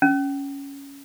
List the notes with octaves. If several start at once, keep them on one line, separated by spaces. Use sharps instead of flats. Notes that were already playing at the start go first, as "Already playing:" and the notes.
C#4